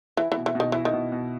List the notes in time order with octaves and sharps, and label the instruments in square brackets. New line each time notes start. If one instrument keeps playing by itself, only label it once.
[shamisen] E3 [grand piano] E4
[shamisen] E3
[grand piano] B2
[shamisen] E3
[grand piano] B2 [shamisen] D#3
[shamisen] E3 [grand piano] E4
[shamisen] D#3
[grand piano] B2
B2